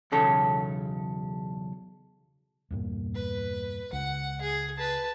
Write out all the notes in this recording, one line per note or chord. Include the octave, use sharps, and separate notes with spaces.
B1 E2 C#3 C#4 A4
E2 G2 A#2
B4
C#2 F#5
G#4
B4 A5